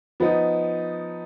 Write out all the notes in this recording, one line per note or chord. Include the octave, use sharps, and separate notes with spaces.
F3 B3 D#4